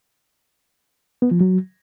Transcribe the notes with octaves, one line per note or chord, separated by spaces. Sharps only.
B3
F3
F#3